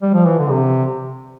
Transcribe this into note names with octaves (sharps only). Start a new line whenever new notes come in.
G3
F3
E3
D3
C3